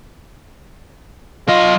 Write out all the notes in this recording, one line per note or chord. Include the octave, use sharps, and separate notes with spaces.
F#3 F4 D#5